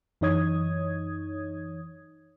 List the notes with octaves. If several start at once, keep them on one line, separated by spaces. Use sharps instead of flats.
F#2 E3 D#4 C#5 D#6 G#6